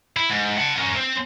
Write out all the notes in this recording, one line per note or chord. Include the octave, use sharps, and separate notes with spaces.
E4
G#2
F#5 A5
C#4 A#4
C4